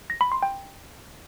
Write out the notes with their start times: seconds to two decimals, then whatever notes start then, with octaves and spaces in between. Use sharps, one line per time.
0.10 A#6
0.21 B5
0.32 C6
0.42 G5